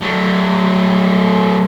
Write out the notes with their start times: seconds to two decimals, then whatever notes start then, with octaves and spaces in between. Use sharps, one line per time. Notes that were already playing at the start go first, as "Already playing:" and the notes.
0.02 F#3 A3